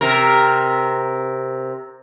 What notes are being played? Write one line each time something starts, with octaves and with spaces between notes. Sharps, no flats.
C3 A#4